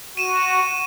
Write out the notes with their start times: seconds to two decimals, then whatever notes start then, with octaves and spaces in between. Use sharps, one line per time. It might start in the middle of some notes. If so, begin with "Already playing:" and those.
0.17 F#4 D#7 E7